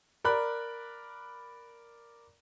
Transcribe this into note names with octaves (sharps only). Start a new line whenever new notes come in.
A#4 D5 B5 F#6